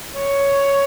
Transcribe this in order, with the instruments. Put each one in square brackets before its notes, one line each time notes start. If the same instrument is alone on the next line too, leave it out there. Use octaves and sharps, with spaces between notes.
[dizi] C#5